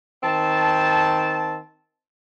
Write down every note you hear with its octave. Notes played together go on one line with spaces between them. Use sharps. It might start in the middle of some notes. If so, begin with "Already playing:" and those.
D#3 C4 A5